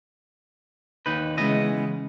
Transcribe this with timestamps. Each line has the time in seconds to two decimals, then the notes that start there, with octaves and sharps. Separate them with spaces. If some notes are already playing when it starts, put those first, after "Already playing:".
1.06 D#2 D#4 B4
1.37 C#3 E3 G#3 B3 D#5